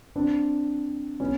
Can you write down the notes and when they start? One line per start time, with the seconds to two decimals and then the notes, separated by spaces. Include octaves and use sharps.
0.16 C4 D4
1.20 B3 C#4